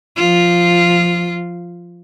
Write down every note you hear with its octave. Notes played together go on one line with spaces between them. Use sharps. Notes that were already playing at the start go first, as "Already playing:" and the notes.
F3 F4